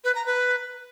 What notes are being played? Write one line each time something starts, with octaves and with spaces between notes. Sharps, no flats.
B4
A#5
B4